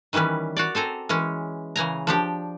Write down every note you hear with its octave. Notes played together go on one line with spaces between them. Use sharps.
D#3 E3 G3 C#4 B4
F#4 C#5 D5
C4 A4 G#5 A#5
E3 G#3 C#4
C#3 E3 G#5 A#5
F3 D4 G4